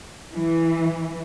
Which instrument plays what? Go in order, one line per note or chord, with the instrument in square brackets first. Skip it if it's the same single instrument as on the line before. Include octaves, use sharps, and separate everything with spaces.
[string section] E3